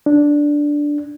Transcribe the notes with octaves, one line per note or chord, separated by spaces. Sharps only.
D4